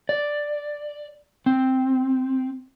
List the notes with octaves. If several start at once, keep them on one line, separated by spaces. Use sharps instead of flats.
D5
C4